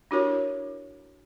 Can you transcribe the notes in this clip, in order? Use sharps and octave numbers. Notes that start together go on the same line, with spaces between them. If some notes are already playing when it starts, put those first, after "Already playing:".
D4 E4 F#4 G4 A#4 C#5